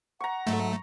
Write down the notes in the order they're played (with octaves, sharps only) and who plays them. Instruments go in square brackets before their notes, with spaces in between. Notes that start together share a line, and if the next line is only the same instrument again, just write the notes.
[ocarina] F#5 [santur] A#5 C#6
[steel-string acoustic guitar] G#2 F#3 [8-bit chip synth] A3